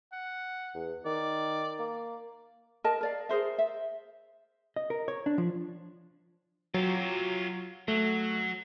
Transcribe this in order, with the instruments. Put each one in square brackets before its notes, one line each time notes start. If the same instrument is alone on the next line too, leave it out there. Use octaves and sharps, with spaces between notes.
[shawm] F#5
[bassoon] E2
[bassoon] D#3 [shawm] D5
[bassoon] A#3
[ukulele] A#4 D#5 A5
A#4 D5 F5
G#4 A#4 C5 E5
E5
[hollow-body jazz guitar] D#5
A#4
C#5
D4
F3
[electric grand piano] F#3 [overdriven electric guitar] F4 G4
[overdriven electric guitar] F#3 [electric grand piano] A3